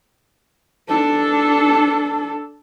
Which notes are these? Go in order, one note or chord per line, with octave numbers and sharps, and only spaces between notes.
D4 A4